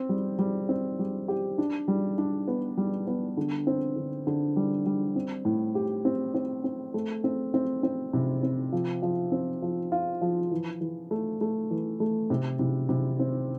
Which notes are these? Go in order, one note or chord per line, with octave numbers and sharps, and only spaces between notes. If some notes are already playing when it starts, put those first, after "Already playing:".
Already playing: C4
G3
G3
C4
G3
G4
D4
G3
D4
B3
G3
B3
D3
C4
D3
D3
G3
G3
C4
A2
G4
C4
C4
C4
A3
C4
C4
C4
C3
C4
F3
F3
C4
F3
F4
F3
E3
E3
A3
A3
E3
A3
C3
C3
C3
C4